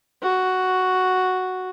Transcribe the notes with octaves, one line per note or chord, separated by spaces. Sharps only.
F#4